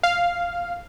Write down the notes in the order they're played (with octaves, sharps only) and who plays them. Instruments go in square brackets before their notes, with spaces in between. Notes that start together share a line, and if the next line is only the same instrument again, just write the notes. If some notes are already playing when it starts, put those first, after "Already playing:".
[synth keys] F5